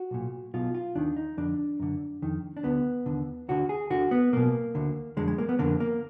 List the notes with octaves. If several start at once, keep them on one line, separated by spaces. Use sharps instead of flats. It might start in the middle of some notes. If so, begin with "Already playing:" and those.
Already playing: F#4
B1 A#2
B1 B2 F4
F4
D#2 D#3 D4
D#4
F2 D3 D4
F#2 D3
F2 D#3
D4
D2 D3 B3
D#2 D3
D2 D3 F#4
G#4
D2 D3 F#4
B3
B1 B2 A#3
D2 D3
F2 D3 G#3
G#3
A#3
B3
F2 D3 A#3
A#3